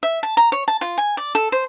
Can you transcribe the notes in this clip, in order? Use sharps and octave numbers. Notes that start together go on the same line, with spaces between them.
E5
A5
A#5
C#5
A5
F4
G#5
D5
A4
C5